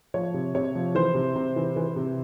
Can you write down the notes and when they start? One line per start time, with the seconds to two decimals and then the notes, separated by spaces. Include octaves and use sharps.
0.14 F3 C#5
0.34 C3
0.54 C3 C#5
0.75 F3
0.95 E3 C5
1.15 C3
1.36 C3
1.56 E3
1.76 E3
1.96 C3